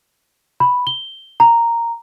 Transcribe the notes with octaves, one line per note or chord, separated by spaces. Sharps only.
B5
G7
A#5